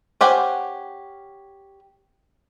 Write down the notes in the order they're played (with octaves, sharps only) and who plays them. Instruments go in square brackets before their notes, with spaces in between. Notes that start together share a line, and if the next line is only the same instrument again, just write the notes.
[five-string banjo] C#4 G4 C5 F#5 G#5